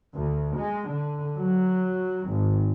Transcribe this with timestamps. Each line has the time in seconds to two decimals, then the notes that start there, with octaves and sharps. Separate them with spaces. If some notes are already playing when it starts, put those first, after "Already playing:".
0.15 D2
0.56 G#3
0.89 D3
1.37 F#3
2.30 G#1